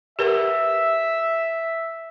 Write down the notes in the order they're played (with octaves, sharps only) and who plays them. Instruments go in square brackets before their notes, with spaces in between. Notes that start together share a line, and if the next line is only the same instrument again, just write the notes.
[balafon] G4 A#4 B4 [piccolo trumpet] E5